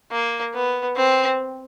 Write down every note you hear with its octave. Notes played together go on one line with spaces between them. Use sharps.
A#3
B3
C4